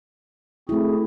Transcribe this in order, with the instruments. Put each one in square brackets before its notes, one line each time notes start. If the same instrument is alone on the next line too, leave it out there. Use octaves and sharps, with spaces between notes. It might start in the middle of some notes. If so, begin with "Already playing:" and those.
[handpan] A3 E4 [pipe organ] C4 F#4 G#4